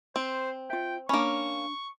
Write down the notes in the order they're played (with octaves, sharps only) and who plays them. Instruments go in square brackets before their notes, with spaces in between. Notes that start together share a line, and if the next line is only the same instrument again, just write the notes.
[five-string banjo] C4 [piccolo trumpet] C5
[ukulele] F4 E5 [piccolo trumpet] G5
[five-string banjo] A#3 C#4 [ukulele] D4 B5 [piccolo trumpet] C#6